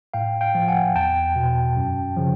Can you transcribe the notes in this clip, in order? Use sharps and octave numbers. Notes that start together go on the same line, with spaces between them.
A2 F5 G5
F5 G5
F3
F#5 G#5
E2 G5 A5
B2
F#2
C#3 F3